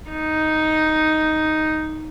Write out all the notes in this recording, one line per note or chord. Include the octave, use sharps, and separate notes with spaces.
D#4